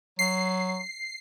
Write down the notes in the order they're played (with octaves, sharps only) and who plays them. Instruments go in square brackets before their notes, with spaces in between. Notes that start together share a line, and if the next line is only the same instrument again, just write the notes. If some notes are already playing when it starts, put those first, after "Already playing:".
[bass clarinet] F#3 [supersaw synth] C7